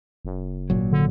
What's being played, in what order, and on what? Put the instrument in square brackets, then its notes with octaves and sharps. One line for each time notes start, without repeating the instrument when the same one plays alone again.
[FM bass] F#1
[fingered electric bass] G#1 A#2 F#3
[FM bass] D3